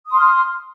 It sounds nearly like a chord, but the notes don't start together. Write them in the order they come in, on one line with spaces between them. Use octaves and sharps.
D#6 C6 F6